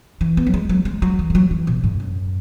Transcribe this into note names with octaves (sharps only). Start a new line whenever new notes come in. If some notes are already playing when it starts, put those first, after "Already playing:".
E3
B3
F#3
G#3
F#3
G#3
F#3
E3
G#3
F#3
E3
B2
G#2
F#2